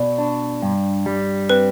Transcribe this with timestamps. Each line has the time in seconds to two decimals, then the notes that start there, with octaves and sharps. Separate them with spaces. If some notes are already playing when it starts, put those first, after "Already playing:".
Already playing: B2 D5
0.18 D4
0.62 G2
1.06 G3
1.49 C4 B4